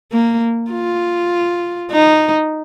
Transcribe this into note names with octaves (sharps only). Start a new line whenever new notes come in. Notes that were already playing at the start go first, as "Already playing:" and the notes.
A#3
F4
D#4